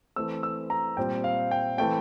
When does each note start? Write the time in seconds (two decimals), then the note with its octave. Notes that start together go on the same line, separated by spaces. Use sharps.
0.16 E3 A3 C4 E6
0.43 E6
0.70 A#5
0.97 A#2 G3 C4 G5
1.24 F5
1.51 G5
1.78 E3 A3 C4 G5